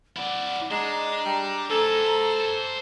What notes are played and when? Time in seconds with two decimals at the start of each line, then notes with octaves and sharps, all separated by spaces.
0.16 E4 D5 F#5
0.71 G#3 D4 A#5
1.25 G3
1.70 A4 C5 G#5